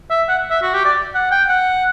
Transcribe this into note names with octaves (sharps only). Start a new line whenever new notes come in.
E5
F#5
E5
F#4
G4
D5
F#5
G5
F#5